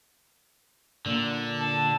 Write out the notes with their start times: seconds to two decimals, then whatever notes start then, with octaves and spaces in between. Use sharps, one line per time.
1.06 A#2 D3
1.60 A5